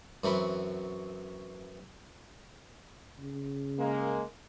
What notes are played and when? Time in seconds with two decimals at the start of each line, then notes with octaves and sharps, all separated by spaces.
0.24 F#2 E3 F#3 C4 A#4 B5
3.19 C#3
3.79 G#3 A#3